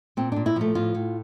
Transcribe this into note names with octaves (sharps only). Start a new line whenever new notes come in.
A#2 C4
A#2 D4
E4
F3 A3
A2 F4
A2